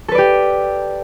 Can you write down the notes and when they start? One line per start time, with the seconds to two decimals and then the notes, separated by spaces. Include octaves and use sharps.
0.08 A4
0.12 B4
0.15 D5
0.18 G4